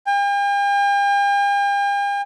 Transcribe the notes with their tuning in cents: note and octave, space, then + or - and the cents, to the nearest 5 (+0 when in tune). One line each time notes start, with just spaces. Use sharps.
G5 +45